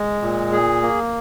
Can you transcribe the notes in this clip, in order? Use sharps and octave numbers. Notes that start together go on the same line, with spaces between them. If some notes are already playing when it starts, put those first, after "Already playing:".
Already playing: G#3
A#2
G#4
A#3